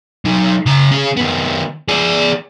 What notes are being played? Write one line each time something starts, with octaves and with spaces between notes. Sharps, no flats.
F#3 D#4
C#3 A#5
C#4 G#4
D#3 B3
G#4 D5